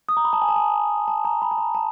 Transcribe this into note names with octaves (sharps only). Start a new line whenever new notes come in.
D#6
A#5
B5
A5
G#5
A5
G#5
A5
A#5
B5
A5
A#5
A5